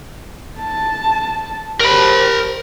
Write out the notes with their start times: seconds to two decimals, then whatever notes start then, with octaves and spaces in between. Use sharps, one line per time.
0.59 A5
1.80 G4 A#4 C5 B5